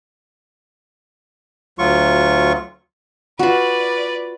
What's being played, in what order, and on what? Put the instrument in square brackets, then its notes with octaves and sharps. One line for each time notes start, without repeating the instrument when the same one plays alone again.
[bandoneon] D2 F#3 F4 C#6
[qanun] F4 F#4 [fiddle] B4 D5